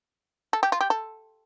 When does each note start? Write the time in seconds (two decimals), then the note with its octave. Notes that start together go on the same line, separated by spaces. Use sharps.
0.53 A4
0.63 G4
0.72 F4
0.81 G4
0.90 A4